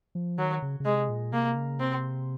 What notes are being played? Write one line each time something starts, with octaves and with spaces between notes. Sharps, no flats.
F3
D#3 F#3
C#3
C#3
C3 G#3
A#2
C3 A#3
C#3
C3 C4